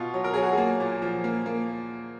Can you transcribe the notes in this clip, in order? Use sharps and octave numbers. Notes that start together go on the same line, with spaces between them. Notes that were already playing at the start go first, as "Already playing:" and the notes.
Already playing: B2 F4
F#3
A#4
F#3 G#4
F#4
G#4
A#3
A#2
F3
A#3
A#3